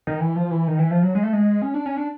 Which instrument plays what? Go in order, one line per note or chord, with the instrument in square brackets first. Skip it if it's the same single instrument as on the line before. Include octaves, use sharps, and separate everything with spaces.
[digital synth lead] D#3
E3
F3
E3
D#3
E3
F3
F#3
G#3
A3
G#3
C#4
D4
C#4
D4